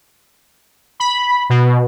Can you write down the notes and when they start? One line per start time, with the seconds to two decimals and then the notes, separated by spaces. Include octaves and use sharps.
1.00 B5
1.50 B2